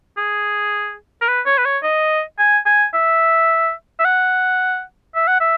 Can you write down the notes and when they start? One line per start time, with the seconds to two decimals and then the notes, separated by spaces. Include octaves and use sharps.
0.17 G#4
1.21 A#4
1.28 B4
1.46 C#5
1.58 B4
1.65 C#5
1.83 D#5
2.39 G#5
2.66 G#5
2.94 E5
3.99 E5
4.05 F#5
5.15 E5
5.27 F#5
5.40 E5